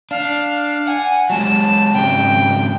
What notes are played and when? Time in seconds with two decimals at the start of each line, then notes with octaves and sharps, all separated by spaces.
0.11 D4 F5
0.87 F#5 G#5
1.30 F#3 G#3 G4 A5
1.94 G#2 C#3 C4 G5